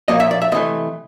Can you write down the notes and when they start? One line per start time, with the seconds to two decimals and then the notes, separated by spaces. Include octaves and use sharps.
0.08 A#2 F3 A#3 C#4 D#5
0.20 E5
0.31 D5
0.42 E5
0.52 C3 E3 A3 D#5